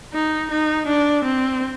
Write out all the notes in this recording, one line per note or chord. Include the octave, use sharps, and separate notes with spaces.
D#4
D#4
D4
C4